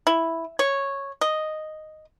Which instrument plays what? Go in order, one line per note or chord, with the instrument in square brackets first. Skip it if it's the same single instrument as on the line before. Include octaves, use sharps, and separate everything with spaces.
[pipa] E4
C#5
D#5